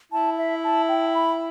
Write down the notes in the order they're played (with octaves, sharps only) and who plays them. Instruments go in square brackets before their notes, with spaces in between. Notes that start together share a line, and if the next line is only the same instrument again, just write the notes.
[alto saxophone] E4 [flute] A5
[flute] E5
A5
G5
B5